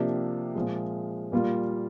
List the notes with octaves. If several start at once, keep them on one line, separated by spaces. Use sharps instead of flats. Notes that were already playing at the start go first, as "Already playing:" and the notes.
Already playing: C3 F3 A#3 D4 G4
A#2 F3 G#3
A#2 G3 A#3 F4